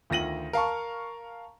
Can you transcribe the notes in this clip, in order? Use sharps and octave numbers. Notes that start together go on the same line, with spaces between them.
D2 D#3 F4 A#6 D#7 F#7
A#4 F5 A5 C#6